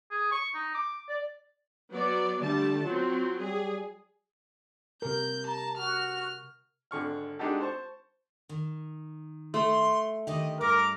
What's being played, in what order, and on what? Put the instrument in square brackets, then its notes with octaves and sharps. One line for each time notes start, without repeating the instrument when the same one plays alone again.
[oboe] G#4
C#6
D#4
D6
D5
[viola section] F#3 B3 D5 [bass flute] B4
[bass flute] D3 [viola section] G3 A3 A5
[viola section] F#3 C4 [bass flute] F4
[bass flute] G3 [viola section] G#4
[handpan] C3 A#4 [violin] G6
[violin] A5 [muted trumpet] A#5
[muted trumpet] F#4 [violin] F6
[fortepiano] G#1 D3 C#6 F6
G#3 D4 D#4 F#4 G4 A4
C5 A5 C#6
[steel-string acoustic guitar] D#3
[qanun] A3 [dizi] C6
[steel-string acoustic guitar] D3 D#3 G4 [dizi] D#5
[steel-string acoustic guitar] G2 G3 [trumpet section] A#4 [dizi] D6